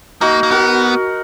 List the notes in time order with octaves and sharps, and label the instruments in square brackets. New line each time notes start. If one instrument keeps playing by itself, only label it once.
[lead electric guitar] A#3 [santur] D#4 F#4
[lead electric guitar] A#3
[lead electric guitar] B3 [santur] F#4 A#4